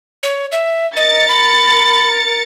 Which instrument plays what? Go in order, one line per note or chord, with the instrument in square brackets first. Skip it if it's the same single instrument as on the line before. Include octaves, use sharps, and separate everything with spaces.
[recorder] C#5
E5
[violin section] A#4 A6 C#7 [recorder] D#5
[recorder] B5